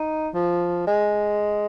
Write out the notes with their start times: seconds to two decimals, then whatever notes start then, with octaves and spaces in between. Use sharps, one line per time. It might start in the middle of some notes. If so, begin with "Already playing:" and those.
Already playing: D#4
0.34 F3
0.87 G#3